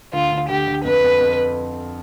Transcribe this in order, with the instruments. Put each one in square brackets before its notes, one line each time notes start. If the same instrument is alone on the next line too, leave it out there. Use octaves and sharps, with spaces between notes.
[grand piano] D2 [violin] F4
[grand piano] D2
[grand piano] D2 [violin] G4
[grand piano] D2
[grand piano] F2 [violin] B4
[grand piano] F2
F2